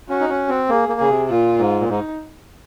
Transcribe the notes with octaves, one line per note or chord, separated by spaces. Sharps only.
C#4 F#4
D#4
C#4
C4
A#3 G#4
A#3
C#3 G#4
C3
A#2 F4
G#2
A#2
G#2 D#4